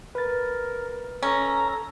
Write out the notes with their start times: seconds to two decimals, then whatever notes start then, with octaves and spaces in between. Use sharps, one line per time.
0.15 A#4 B4 A6
1.23 C#4 A4 A#5